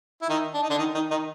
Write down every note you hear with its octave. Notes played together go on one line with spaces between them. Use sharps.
E4
D#3 D#4
D4
D#4
D3 D4
D#3 D#4
D#3 D#4
D#3 D#4